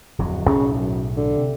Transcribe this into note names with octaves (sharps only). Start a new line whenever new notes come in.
D1 F2 F#3
B1 A2 C#3
F#2
D3
C3